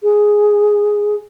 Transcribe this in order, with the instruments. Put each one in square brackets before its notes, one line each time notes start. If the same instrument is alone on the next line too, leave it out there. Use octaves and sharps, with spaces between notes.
[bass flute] G#4